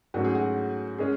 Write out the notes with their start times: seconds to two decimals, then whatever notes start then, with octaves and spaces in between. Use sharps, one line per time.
0.14 G#2 F#3 A3 C#4 F#4
0.25 G#4
0.35 F#4
0.98 G#3 C#4 G#4